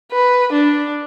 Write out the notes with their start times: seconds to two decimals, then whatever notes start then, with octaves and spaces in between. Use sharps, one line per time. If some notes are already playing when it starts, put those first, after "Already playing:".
0.11 B4
0.52 D4